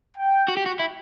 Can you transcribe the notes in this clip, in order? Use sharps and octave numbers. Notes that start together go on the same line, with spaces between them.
G5
F#4
G4
F#4
E4